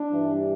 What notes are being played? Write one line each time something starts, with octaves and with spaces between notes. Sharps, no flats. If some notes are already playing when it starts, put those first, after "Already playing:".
Already playing: D4
G2 E3 G3